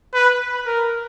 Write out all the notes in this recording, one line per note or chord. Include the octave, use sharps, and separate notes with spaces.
B4
A#4